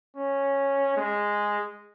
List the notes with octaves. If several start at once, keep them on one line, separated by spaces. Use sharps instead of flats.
C#4
G#3